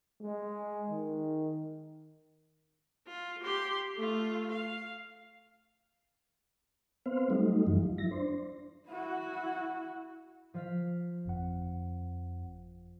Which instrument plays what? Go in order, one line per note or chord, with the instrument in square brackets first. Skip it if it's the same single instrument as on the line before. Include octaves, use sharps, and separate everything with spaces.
[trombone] G#3
D#3
[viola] F4
G4 C6
A3 F4
F5
[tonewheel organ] B3 C4 C5 F5
F#3 G3 A3 D#4
F#2 E3 F3 G3
F3
E4 A#6
D4 C5
[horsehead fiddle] E4 F#4
[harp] F3 F5 B6
[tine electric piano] G1 F2 F#5